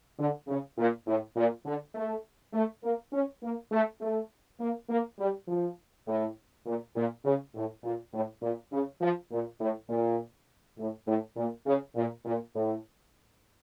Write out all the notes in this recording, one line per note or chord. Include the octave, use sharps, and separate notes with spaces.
D3
C#3
A#2
A2
A#2
D3
A3
A3
A#3
C#4
A#3
A3
A3
A#3
A#3
G3
F3
A2
A#2
A#2
C#3
A2
A#2
A2
A#2
C#3
F3
A#2
A2
A#2
A2
A2
A#2
C#3
A#2
A#2
A2